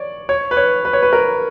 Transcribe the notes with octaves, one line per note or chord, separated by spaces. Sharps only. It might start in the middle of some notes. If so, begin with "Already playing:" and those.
Already playing: C#5 D5
C#5
B4
C#5
B4
C#5
B4
A#4